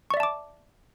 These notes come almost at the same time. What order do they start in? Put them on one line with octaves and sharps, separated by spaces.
C#6 D5 E5 A5 D6